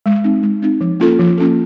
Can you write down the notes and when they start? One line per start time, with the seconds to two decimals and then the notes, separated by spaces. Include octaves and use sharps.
0.06 G#3
0.24 C4 D#4
0.43 G#3
0.62 C4 D#4
0.81 F3
1.00 A#3 C#4 F4 A4
1.19 F3
1.38 A#3 C#4 F4 A4